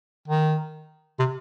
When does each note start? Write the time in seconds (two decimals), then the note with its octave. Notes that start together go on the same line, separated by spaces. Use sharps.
0.28 D#3
1.19 C3